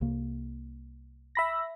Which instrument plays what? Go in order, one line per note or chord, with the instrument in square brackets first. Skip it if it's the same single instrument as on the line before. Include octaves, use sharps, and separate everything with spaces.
[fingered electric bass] C2 C3 A#3
[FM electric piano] E5 B5 A#6